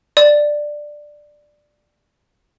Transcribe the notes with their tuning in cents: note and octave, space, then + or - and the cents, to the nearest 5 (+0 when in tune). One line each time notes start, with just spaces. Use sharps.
D5 +10